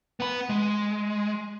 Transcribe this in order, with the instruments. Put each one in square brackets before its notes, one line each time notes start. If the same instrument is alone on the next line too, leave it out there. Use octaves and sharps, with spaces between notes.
[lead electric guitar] B3 B5
G#3